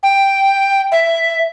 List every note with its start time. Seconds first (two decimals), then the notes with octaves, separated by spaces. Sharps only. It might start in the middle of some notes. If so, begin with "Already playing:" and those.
0.03 G5
0.92 E5